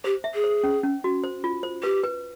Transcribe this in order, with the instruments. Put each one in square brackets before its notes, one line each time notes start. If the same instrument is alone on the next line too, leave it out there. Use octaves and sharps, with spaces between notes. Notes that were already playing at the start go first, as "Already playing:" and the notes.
[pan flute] G4 [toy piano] C5
[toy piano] E5
[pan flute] G#4
[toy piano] C5
C#4
C#4
F#4
C5
F4
C5
[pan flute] G4 [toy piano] B4
[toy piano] B4